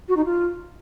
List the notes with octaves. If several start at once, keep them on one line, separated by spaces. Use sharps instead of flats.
F#4
D#4
F4